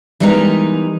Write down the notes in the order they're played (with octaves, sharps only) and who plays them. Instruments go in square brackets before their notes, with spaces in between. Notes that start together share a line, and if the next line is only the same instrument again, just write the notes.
[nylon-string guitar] E3 G3 G#3 B3 D#4 A#4